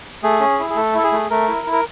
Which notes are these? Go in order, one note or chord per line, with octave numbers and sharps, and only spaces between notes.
A3 G#4
C#4
E4
G#4
A3 A4
E4 A4
G#4
A3
A3 A#4
E4
E4
A#4